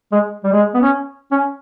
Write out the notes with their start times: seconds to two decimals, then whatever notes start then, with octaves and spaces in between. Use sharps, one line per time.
0.12 G#3
0.44 G3
0.52 G#3
0.74 B3
0.82 C#4
1.31 C#4